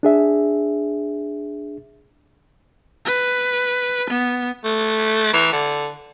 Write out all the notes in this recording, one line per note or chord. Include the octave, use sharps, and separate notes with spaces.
D4 G#4 E5
B4
B3
A3
E3
D3